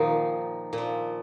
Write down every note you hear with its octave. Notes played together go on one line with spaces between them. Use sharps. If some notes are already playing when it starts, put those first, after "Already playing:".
Already playing: A#2 D#3 F3 D#4
A#2
F3